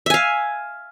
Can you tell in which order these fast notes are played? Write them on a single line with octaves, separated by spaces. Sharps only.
E5 G#5 F5